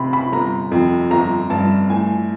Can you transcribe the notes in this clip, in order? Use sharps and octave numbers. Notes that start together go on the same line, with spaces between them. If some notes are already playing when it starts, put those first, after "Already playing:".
Already playing: C3 B5 C6
B5
G1 A#5
F2
G1 A#5
G2 A5
A2 G#5